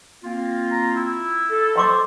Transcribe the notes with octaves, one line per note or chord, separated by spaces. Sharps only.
A#3 C4 F4
A#5
E4
A4
C5 D#5 C6 D6